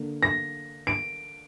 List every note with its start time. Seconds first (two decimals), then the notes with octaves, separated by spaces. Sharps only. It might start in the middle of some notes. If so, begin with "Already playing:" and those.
Already playing: D3 A#3
0.23 A#6
0.87 D7